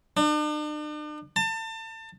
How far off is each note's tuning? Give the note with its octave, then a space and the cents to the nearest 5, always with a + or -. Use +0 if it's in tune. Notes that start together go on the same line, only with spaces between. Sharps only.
D4 +45
A5 +30